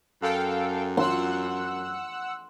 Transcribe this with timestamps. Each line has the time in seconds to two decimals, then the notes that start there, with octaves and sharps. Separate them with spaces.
0.22 F#2 A4 F5 G5
0.97 F#5 C6 E6 F#6